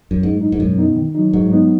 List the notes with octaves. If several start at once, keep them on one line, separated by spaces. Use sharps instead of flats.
F#2
G#2 F#3
D#4
G#2
F#2 B2
B3 D#4
D#3
F#3 D#4
G#2 F#3
B3 D#4